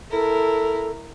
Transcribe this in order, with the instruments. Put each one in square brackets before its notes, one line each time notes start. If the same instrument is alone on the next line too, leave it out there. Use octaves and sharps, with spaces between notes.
[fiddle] E4 A#4 [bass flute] A4